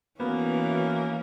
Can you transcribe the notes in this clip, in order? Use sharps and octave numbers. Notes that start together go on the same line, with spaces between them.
E3 A#3 B3 C#4 F#4